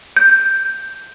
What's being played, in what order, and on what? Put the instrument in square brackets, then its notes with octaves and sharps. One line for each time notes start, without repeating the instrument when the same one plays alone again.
[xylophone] G6